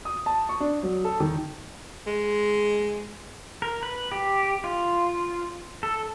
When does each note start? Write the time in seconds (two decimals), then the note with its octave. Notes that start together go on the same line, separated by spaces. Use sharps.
0.05 D#6
0.26 A5
0.49 C#6
0.60 D4
0.83 F#3
1.04 A4
1.20 D#3
2.07 G#3
3.62 A#4
3.83 B4
4.12 G4
4.64 F4
5.83 A4